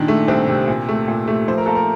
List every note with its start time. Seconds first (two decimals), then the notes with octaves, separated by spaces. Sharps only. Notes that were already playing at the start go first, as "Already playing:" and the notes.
Already playing: A#2 D#3 D4
0.08 A3
0.28 C2 C4
0.47 C3
0.68 A#2
0.89 A3
1.08 A#2
1.28 A3
1.48 F3 C5
1.58 A#4
1.66 A#3 A4
1.75 A#4